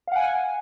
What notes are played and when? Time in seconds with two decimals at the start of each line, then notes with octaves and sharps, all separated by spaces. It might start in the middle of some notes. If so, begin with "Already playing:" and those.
0.07 F5
0.12 F#5
0.16 G#5